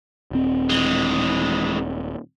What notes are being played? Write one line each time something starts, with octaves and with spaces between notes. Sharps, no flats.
D#1 C4
E3 G#3